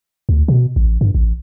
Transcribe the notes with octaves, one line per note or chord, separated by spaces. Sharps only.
D2
B2
A1
G2
A1